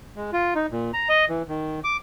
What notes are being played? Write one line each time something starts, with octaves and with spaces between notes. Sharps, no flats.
G#3
F4
D#4
A#2
A#5
D#5
E3
D#3
D6